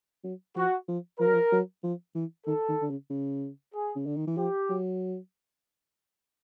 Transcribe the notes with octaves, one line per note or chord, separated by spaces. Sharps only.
F#3
F3 F#4
F3
F3 A#4
F#3
F3
F#3
F3
E3
D#3 A4
D#3
D3
C#3
C#3
G#4
C#3
D3
D#3
E3
F3 G4
F#3